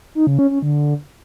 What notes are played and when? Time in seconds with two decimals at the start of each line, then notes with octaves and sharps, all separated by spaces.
0.15 D#4
0.27 C#3
0.39 C#4
0.51 C#4
0.62 D3